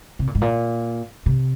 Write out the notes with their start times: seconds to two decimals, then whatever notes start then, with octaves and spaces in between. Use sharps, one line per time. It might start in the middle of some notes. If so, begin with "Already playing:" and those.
0.19 C3
0.27 A#2
0.35 G#2
0.42 A#2
1.26 C3